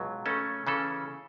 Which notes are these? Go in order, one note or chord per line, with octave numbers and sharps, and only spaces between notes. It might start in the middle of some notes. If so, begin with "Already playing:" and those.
Already playing: C#2 B2 F#3
C#3 A3 C#4 A4
C#3 E3 C#4 A4